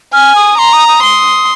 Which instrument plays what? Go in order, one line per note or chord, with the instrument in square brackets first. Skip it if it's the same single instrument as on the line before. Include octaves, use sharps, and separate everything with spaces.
[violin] G#5 [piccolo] F6
[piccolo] D#6
[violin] A#5 [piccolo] C6
[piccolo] D#6
D#6
[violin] C6